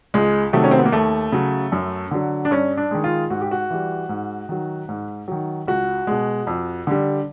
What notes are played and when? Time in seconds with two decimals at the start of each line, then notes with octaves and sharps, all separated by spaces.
0.14 C#2 G#3
0.53 C3 D#3 F#3 A3
0.64 C#4
0.71 C4
0.79 B3
0.85 A#3
0.92 D#2 A3
1.32 C#3 F#3
1.72 F#2
2.11 D3 F#3
2.45 D4
2.51 G2 C#4
2.77 D4
2.91 D#3 G#3
3.04 F4
3.30 G#2 F#4
3.41 G4
3.51 F#4
3.70 E3 G3
4.09 G#2
4.49 D#3 F#3
4.89 G#2
5.28 D#3 F#3
5.68 C#2 F#4
6.07 B2 G#3
6.47 F2
6.87 D3 G3